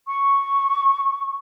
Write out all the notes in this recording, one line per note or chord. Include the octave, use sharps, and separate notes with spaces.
C#6